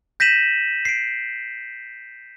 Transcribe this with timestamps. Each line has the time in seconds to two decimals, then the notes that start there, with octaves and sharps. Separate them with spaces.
0.20 G6 A#6 B6 D#7 E7 F#7
0.85 C7 D7